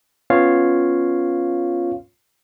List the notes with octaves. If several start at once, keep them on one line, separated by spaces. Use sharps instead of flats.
B3 C#4 F4 C#5 F5